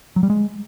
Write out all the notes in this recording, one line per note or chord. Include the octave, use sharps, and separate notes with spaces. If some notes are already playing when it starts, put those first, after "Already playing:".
F#3
G3
G#3